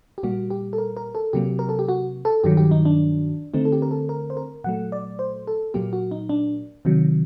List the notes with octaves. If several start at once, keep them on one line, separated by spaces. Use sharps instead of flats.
G4
A#2 G3 A#3 F#4
G4
A4
A#4
A#4
A4
C3 F#3 A#3 G4
A#4
A4
G4
F#4
A4
G2 D#3 F#3 G4
G4
D#4
D4
D3 A3 C4 D#4
A4
G4
A#4
A4
A#4
C5
A#4
A#2 F#3 A3 F#5
D5
C5
A4
A#2 F#3 A#3 G4
F#4
D#4
D4
C3 D#3 F#3